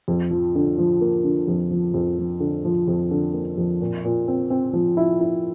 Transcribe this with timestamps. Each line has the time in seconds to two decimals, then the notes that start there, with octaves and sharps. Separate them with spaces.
0.08 F2
0.31 F3
0.55 D3
0.78 F3
1.01 A#3
1.24 D3
1.48 F2
1.71 F3
1.94 F2
2.18 F3
2.40 D3
2.65 F3
2.88 F2
3.11 D3
3.34 A#3
3.57 F2
3.81 A#2
4.05 A#2
4.28 C4
4.50 C4
4.73 F3
4.97 E4
5.21 E4